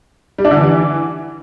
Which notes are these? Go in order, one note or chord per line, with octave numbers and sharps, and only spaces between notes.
G3
D4
D3
E3